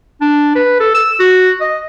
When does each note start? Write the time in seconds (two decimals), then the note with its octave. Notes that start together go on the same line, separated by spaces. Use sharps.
0.21 D4
0.55 B4
0.80 A4
0.94 E6
1.20 F#4
1.61 D#5